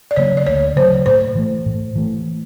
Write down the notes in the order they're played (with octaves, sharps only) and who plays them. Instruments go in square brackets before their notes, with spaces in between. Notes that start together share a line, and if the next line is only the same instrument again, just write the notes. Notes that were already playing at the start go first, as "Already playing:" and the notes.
[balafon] D5
[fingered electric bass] C#3 F#3 A#3 [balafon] C#5
[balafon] D5
[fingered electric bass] D2 [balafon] C#5
[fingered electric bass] C#3 F#3 A#3 [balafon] C5
[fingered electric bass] A2 [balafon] C5
[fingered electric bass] E3 A3
A2
E3 A3